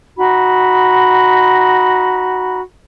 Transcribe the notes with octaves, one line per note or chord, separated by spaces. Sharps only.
D#4 F#4 B5